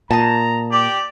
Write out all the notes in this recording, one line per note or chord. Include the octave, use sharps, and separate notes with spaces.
A#2 A5 A#5 D#6
G4 D5